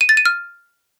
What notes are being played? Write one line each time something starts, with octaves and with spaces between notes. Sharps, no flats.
D#7
A6
D#7
F6